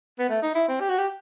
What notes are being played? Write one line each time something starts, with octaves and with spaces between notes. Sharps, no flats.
B3
A3
D#4
E4
C4
G4
F#4
G4